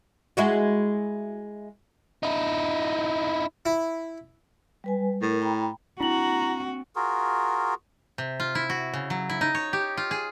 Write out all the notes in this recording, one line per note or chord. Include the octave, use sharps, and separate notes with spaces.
G#3 E4 F#4
D#4 E4
E4
G3 B4 G#5
A2 A#4
G5 A#5 B5
C4 D4 E4 F#4 A#5 F#7
F4 F#4 G#4 A#4
C3
F4
E4
F#4
C#3
F#3
E4
D#4
C#5
G4
F4
G#4